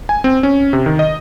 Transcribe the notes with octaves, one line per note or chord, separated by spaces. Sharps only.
G#5
C4
C#4
C3
D#3
D#5